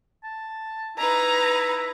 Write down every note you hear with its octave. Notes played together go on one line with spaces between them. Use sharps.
A5
D#4 E4 B4 A#5